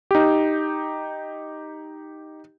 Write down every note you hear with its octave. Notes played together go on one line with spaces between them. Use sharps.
D#4 G4